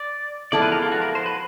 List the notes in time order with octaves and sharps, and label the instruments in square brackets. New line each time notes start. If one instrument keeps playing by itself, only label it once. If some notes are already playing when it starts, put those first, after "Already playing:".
Already playing: [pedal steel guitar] D5
[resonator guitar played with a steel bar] F3 G#3 B3 E4 A4 [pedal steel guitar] D5
[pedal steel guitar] B4
A#4
F4
F#4
A#4
C5
B4